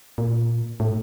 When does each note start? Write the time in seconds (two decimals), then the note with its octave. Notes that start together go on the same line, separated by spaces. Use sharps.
0.18 A#2
0.80 A2